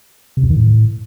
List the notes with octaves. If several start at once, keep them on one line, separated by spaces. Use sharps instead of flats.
C3
E2
D#3
A2